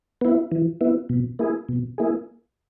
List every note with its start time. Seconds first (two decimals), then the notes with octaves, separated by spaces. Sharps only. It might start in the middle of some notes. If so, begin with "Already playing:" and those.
0.21 B3 E4
0.52 E3
0.81 B3 E4
1.09 B2
1.39 A#3 E4 G#4
1.69 B2
1.98 A#3 E4 G#4